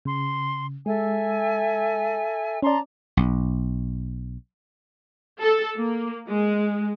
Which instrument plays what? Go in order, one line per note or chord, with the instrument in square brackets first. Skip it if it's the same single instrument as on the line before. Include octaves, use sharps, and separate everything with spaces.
[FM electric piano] C#3 [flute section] C6
[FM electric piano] G#3 [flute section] A4 E5 G#5
[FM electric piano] C#4 D5 [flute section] A5 A#5 C6
[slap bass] B1
[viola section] A4
A#3
G#3